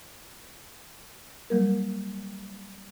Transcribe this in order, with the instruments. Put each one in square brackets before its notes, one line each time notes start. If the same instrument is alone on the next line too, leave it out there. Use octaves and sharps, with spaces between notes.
[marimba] F#3 G3 A#3 A#4